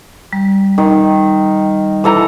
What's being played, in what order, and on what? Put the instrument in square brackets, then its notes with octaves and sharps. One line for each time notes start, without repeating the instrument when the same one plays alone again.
[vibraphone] G3
[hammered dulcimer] D#3
E3 A4 A#5